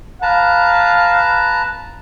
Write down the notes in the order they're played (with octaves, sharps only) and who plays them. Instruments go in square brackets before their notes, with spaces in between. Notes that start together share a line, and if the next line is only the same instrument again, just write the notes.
[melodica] B4 A5 A#5 [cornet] F5